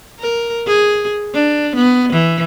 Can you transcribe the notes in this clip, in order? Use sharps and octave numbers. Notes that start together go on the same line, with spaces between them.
A#4
G#4
D4
B3
E3